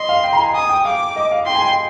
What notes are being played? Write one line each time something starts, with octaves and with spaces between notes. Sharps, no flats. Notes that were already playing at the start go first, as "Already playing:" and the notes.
Already playing: D#5 C6
F5
G5
A#5
G#5
G#5 D#6
G5
F5 D6
D#5
F5
G5 C6
G#5
G5